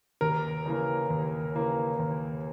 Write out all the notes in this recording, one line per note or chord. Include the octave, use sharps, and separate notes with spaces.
D#2 A#4
C#3 E3 A#3
D#2
C#3 E3 A#3
D#2